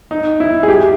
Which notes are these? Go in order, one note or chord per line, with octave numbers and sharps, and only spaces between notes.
D#4
E4
G#4
G4